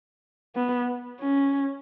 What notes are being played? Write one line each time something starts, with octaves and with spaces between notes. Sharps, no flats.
B3
C#4